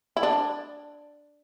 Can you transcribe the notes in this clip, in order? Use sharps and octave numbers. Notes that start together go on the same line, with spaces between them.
E4
D4